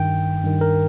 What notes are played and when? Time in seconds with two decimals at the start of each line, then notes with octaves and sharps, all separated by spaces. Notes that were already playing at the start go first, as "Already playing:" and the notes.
Already playing: G2 D#3 G5
0.43 G2 D#3
0.61 A#4